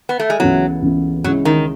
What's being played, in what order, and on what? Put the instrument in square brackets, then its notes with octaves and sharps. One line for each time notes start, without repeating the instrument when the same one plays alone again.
[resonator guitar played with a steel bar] B3
A3
G#3
[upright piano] C#2 C#3 E3 B3 E4 [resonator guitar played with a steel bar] F#3
[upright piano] C#2 C#3 E3 B3 E4
[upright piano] C#2 C#3 G#3 C#4 E4 [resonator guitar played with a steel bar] F#3
[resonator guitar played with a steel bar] D#3